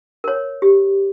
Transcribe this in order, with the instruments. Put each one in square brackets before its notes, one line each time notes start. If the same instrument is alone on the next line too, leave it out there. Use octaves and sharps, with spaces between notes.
[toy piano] A#4 C#5
G4